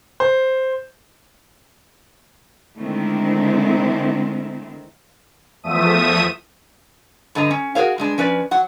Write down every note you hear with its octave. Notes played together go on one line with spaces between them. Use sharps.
C5
D3 D#3 G#3 A3 C4 E4
E2 F3 A3 E5 D#6 D#7
G2 D3 D#5 A#5
C#4
F#4 G#4 A#4 C#5 F5
G2 G#3 D4
F3 C#4 B4 D5
F#3 F#5